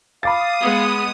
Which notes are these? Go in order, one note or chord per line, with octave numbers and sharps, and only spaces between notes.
F5 B5 D6 D#6 A6
G#3 B3